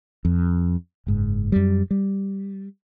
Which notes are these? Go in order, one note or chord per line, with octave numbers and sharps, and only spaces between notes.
F2
F#1 G#2
F#2 G3
G3